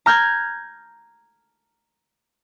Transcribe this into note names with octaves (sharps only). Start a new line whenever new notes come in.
A#5 F6 G6 G#6